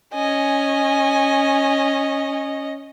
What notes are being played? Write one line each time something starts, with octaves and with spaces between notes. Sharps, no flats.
C#4 D#5 G#5